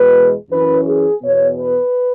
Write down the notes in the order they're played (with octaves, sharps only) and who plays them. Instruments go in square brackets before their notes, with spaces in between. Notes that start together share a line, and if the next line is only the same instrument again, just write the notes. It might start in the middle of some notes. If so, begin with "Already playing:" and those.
Already playing: [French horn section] E2 B2 G#3 B4
F#2 E3 C#4 B4
G#4
E2 B2 B3 C#5
B4